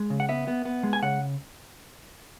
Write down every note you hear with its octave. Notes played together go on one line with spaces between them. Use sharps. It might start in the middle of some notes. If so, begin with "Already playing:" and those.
Already playing: G#3
C#3
F#5
B3 E5
B3
B3
G#3
G#5
C#3 F#5